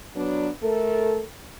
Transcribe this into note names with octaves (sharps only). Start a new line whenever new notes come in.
F#3 B3 D4
A3 A4 A#4